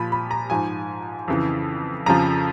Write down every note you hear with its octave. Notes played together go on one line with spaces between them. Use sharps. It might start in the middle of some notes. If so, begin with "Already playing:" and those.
Already playing: A#2 F3 B5
B5
A#5
G#2 F3 G#5
F2 C#3 E3
F2 C#3 F3 A#5